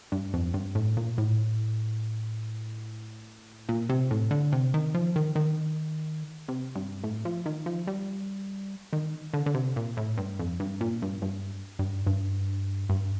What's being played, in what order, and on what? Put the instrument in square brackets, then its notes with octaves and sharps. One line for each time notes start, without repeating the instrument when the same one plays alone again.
[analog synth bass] G2
F2
G2
A2
A#2
A2
A#2
C3
A2
D3
C3
D#3
F3
D#3
D#3
C3
G2
A2
F3
D#3
F3
G3
D#3
D3
D3
C3
A#2
A2
G2
F2
G2
A#2
G2
G2
G2
G2
G2